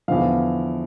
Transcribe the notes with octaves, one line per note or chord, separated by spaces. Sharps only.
E2 D3 F3 F5